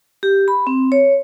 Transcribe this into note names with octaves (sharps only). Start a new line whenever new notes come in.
G4
B5
C4
C#5